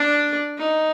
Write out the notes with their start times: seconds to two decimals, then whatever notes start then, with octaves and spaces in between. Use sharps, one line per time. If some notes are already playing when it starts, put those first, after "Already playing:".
Already playing: D4
0.58 D#4